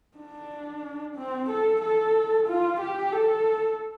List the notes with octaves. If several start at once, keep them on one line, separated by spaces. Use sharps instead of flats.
D4
C4
A4
A4
F4
G4
A4